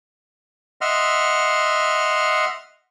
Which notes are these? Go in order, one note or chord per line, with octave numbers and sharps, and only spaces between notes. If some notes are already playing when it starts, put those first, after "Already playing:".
D#5 E5 F#5 C6 F6